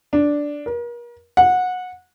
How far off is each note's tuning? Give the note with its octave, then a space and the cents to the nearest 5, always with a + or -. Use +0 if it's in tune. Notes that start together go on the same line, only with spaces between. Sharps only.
D4 -5
A#4 +40
F#5 -20